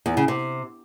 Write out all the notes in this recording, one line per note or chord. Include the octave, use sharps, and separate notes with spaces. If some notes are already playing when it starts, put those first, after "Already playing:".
E2
C#3
C3